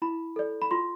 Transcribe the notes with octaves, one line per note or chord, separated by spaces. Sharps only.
E4 B5
A4 D5
B5
F4 C6